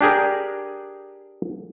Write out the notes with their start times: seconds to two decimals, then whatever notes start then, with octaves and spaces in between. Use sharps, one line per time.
0.01 D4 G4 G#4 A#4